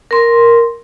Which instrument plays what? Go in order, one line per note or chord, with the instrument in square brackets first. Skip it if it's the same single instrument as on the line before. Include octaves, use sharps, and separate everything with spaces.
[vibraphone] A#4 C6